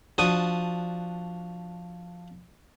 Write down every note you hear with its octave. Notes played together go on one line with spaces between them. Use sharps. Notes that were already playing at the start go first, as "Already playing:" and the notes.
F3 D4 F#4 D#6